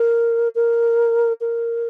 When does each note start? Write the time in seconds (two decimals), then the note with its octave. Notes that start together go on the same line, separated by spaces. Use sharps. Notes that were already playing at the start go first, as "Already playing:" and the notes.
Already playing: A#4
0.55 A#4
1.41 A#4